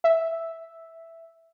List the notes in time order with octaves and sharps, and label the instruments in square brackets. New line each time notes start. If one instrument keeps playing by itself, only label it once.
[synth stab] E5